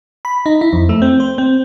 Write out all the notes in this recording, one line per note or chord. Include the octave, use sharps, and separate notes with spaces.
B5
D#4
E4
F2
A3
C4
C5
C4